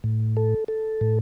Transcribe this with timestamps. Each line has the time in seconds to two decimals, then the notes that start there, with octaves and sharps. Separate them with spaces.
0.04 A2
0.37 A4
0.68 A4
1.01 A2